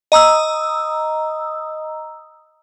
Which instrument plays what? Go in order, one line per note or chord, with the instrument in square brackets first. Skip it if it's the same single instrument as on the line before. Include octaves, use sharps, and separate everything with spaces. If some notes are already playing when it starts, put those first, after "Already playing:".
[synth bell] D#5 A#5 D#6 E6